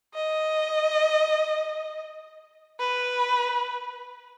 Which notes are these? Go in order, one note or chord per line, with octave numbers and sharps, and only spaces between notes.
D#5
B4